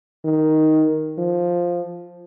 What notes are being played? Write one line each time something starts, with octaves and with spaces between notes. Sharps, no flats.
D#3
F3